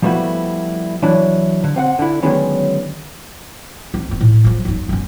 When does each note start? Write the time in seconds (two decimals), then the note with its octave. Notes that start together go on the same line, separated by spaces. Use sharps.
0.02 F3 G3 A3 B3 E4 F#4
1.02 E3 F#3 D4 E4
1.64 D3
1.76 C4 F5 F#5
1.99 D3 E4
2.23 D3 D#3 F#3 G#3 B3 C#4
3.94 C4 D4
4.09 E3 C4
4.21 A2
4.44 F3 F#3
4.65 F#2 D#4
4.89 F#2 C#4